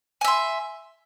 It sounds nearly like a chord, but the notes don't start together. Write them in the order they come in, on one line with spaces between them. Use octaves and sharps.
G#5 E5 C6